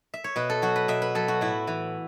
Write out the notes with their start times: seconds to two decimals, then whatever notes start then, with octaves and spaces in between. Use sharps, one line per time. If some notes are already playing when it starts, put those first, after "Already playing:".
0.14 E5
0.24 C#5
0.36 B2 B4
0.50 A4
0.62 F#3 F#4
0.76 B4
0.88 B2 E5
1.02 B4
1.15 F#3 A4
1.28 F#4
1.41 A2 E4
1.67 E3